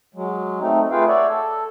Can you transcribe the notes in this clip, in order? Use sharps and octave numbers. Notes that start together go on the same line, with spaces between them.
F#3 G#3
A3 C4 D#4
A3 F4 G#4 B4 F5 G5
C#5 D5 E5 F#5
A4